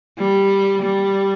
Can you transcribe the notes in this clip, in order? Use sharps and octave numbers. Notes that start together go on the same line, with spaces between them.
G3
G3